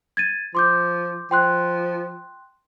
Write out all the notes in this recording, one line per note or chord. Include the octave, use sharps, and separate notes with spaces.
G#6 A6 D#7
F3 C6 D6 G6
F3 G5 C6 F#6